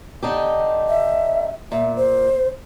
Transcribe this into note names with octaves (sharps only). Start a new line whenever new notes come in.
D3 D#4 G4
E5
A#2 E5
C5